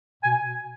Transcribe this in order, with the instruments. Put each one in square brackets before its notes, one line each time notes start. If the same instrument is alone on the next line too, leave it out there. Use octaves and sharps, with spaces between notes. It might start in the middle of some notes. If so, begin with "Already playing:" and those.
[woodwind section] B2 G#5